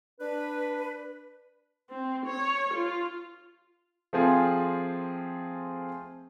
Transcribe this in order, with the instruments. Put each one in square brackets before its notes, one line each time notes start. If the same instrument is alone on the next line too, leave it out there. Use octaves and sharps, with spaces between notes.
[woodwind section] D4 B4
[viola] C4
C#5
F4
[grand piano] F3 A3 C4 F4 G#4